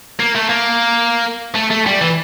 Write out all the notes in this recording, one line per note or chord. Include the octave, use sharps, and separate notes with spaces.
A#3
A3
A#3
A3
A3
G3
E3